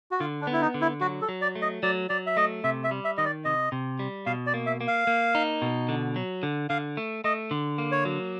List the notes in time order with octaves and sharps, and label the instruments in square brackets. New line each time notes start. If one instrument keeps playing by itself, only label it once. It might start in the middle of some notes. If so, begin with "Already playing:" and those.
[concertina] F#4
[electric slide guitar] D3 [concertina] F4
[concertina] D4
[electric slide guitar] B3
[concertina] E4
D#4
[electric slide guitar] D3
[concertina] E4
[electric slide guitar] F#3 [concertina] F#4
[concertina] A4
[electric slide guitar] F#3
[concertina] D5
[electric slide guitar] A3
[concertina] D#5
[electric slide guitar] F#3 [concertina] D5
[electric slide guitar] F#3 [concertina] D5
[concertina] E5
[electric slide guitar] A3 [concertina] D#5
[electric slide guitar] C3 [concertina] E5
[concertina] E5
[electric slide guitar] G3
[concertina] E5
[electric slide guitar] D#3 [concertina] D#5
[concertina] D5
[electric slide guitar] C3 [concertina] D#5
[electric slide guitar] C3
G3
[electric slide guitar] B2 [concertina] F5
[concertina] D5
[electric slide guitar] A#3
[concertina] E5
[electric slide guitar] A#3
[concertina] F5
[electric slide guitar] A#3
D#4
B2
D3
F#3
D3
[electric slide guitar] D3 [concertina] F5
[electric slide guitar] A3
[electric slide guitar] A3 [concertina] D#5
[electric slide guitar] D3
A#3
[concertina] C#5
[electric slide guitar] F#3